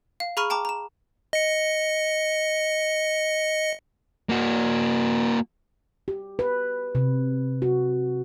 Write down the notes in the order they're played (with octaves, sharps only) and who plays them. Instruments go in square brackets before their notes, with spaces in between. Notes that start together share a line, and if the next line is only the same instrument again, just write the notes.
[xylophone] F5
G#4 A#5 B5 C#6 F6 D#7
G5 A5 A#5 D6
A#5 E7
[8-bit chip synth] D#5 C#7
[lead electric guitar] A#3 F#4
[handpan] G4
B4
C3
F#4